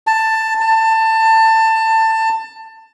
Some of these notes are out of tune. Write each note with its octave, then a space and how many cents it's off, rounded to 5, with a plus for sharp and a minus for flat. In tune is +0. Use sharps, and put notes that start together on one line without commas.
A5 +10
A5 +20